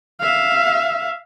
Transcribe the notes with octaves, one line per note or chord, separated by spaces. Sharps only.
E5 F5